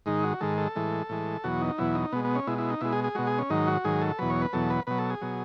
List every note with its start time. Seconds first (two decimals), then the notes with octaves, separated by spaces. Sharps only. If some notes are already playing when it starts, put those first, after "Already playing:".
0.06 G#2 D#3 G#3 D#4
0.23 F#4
0.41 G#2 D#3 G#3 A4
0.58 A4
0.76 A2 E3 G#3
1.09 A2 E3 G#3
1.44 E2 B2 F#3 F#4
1.61 D#4
1.78 E2 B2 F#3 E4
1.95 D#4
2.12 B2 B3
2.16 G#3
2.25 B3
2.35 C#4
2.47 B2 G#3 E4
2.58 E4
2.70 D#4
2.81 B2 G#3 E4
2.92 G#4
3.04 G#4
3.15 B2 G#3 F#4
3.27 G#4
3.38 C#4
3.50 G#2 D#3 F#3 D#4
3.67 F#4
3.84 G#2 D#3 F#3 G#4
4.01 A4
4.19 E2 B2 F#3 B4
4.30 C#5
4.42 B4
4.53 E2 B2 F#3 A4
4.70 B4
4.87 B2 F#3 B4
4.98 A4
5.10 G#4
5.21 B2 F#3